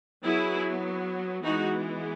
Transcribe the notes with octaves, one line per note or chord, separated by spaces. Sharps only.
F#3 B3 E4 G#4
E3 G#3 B3 D#4 F#4